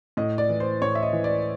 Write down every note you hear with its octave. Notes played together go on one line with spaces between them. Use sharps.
A2 D#5
D5
E3
C5
A2 C#5
E5
D#5
E3
D5